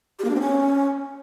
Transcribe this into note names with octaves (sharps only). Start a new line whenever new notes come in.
G4
A#3
D4
C4
C#4